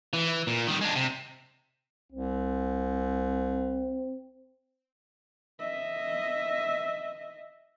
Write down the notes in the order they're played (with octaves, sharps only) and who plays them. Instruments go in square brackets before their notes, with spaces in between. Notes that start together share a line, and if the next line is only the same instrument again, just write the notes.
[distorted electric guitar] E3
A#2
D#3 G3
G#3 D4
C3
[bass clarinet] C2 [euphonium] C4
[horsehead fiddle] D#5 E5